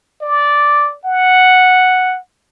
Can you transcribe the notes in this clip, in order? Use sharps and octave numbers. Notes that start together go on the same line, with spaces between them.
D5
F#5